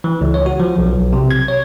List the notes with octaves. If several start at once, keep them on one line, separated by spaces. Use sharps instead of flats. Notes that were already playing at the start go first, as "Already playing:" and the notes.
E3
C#2
C#5
F#4
F3
B1
B1
C3
G#6
C#5